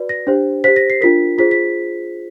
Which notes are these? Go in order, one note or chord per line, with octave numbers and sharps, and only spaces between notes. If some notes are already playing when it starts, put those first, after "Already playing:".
Already playing: F#4 B4 D5
A#6
D4 G4 C5
G4 C5 B6
A#6
C7
D4 F4 A#4 B6
F4 G#4 C5 B6
B6